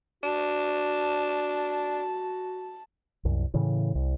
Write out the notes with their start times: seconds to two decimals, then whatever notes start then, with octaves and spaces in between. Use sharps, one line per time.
0.24 D4 F#4 A5
3.25 C2 F#2
3.54 A2 C#3 E3
3.95 C2